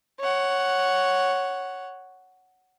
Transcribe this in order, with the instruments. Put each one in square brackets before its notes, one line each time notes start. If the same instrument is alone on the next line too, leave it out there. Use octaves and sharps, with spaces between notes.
[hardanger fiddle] C#5 F#5